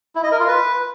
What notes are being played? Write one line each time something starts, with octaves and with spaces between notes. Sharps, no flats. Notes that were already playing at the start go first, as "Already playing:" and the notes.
E4
D#5
A#4
F4
B4